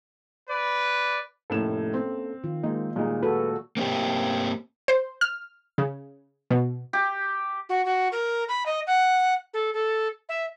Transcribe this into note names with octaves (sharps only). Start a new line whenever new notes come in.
B4 D5
F1 A2 A#3 C#4 A4 E7
C4
D#3 F4
G#3 A#3 D#4
A#2 G3 G#3 D#4
F#4 A4 B4
A#3 C4 D4 G4
C5
F6
C#3
B2
G4
F#4
F#4
A#4
B5
D#5
F#5
A4
A4
E5